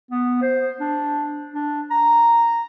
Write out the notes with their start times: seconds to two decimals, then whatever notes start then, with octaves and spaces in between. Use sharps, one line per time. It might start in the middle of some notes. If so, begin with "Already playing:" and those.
0.11 B3
0.42 C5
0.80 D4
1.54 D4
1.91 A#5